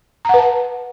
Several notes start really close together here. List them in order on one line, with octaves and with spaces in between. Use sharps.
A#5 F#5 B4 A5